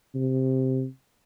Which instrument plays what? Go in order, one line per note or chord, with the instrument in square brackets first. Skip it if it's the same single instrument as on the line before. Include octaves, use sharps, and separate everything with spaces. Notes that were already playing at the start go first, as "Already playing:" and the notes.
[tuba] C3